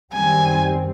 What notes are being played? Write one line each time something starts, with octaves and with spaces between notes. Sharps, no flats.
F#2 D#3 G3 C4 G#5